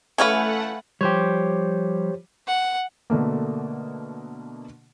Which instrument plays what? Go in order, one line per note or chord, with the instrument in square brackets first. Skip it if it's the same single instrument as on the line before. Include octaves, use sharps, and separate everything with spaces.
[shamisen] E3 C#4 E4 [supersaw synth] A3 F#5 [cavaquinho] B4 F5 G#5
[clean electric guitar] F3 G3 [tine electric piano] G4 C5 C#5
[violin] F#5
[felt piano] B2 D3 A3 A#3